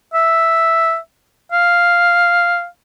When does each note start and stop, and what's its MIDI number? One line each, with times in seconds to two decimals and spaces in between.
0.14 0.97 76
1.52 2.66 77